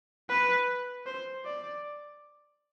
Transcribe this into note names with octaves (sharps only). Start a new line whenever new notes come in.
B4
C5
D5